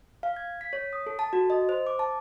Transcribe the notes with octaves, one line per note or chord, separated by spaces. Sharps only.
F5
G#6
B6
C#5
D#6
A4
A5
F#4
D#5
C5
D6
A5